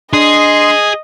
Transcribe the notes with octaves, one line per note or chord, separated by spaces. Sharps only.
D4 G#4 D#5 C6